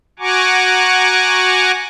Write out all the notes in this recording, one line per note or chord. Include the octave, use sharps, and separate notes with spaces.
F#4 F#5 G#5 A#5 C#6 D6